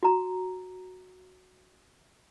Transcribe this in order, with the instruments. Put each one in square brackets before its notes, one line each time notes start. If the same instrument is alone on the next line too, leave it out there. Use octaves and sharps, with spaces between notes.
[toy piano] F#4 A#5